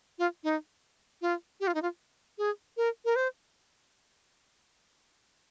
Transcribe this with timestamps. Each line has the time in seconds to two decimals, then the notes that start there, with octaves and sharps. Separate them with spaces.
0.19 F4
0.44 D#4
1.22 F4
1.60 G4
1.67 F4
1.74 D#4
1.82 F4
2.38 G#4
2.77 A#4
3.05 A#4
3.16 C5